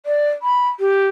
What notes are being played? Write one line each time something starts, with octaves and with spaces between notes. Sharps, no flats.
D5
B5
G4